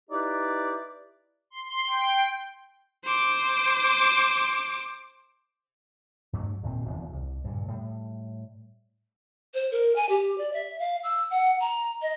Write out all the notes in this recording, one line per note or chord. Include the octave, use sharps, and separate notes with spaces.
D#4 E4 G4 B4 D5
C6
G5
C5 D6
G2 F#3 A3
D1 G#1 A#2 C4
F1 E2 D#3
C2
G2 A#2 C#3
A2 G3
C5
A#4
G#5
G4
D5
E5
F5
E6
F#5
A#5
D#5